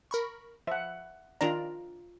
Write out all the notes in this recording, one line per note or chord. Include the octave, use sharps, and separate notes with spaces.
A#4 B5 C#6
F3 E5 F#5
D#3 D4 F4 D5 A#5